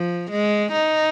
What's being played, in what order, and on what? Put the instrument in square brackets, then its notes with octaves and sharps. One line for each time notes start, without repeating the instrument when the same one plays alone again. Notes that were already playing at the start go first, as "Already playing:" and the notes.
Already playing: [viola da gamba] F3
G#3
D#4